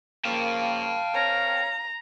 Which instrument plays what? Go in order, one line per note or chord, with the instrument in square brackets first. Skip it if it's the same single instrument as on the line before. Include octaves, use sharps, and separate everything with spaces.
[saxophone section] C#3 F3 A#3 [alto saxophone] F5 [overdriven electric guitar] G5 A5
[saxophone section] C4 A#4 C#5 [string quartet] A#5